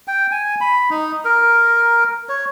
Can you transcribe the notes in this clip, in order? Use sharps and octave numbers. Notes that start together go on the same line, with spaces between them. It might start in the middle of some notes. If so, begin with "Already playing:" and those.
G5
G#5
B5
D#4
A#4
C#5